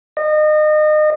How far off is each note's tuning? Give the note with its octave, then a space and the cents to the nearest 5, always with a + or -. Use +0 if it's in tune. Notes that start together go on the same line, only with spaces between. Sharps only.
D#5 -30